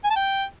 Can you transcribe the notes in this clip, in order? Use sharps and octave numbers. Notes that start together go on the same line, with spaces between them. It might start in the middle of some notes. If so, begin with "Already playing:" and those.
G#5
A5
G5